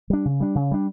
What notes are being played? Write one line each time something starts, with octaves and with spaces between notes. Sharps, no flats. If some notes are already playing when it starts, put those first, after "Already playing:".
G3 D4
C#3
G3 D4
C#3
G3 D4